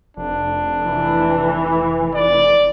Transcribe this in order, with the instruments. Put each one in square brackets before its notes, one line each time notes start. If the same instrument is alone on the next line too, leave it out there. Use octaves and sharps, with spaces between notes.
[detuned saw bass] F1 [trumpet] D4
[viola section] E3
[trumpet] D5